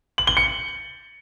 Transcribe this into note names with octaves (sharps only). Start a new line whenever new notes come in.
F#7
G7
C#7